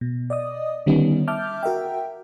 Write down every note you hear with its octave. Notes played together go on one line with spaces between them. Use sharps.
B2
D5 D#5 D#6
D3 D#3 G3 B3 C#4 D#4
E5 A5 D6 F6 G6
F#4 A#4 E5 G5